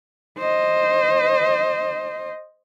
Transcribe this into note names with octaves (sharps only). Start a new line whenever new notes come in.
C5 D#5